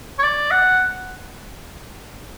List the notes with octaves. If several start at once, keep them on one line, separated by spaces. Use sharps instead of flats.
C#5
D5
F#5